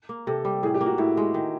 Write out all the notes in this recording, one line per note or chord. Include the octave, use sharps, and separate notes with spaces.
A#3
C3 A4
G3
A2 G#4
G4
A#3
F#4
A2 E4
G#3
D#3